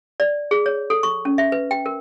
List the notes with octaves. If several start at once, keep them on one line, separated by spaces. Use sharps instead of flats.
D5
G#4
C#5
A4
C#6
C#4
E5
B4
G5
A#4